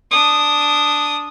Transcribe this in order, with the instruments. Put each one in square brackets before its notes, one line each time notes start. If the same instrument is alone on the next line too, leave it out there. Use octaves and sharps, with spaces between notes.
[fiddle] D4 D#6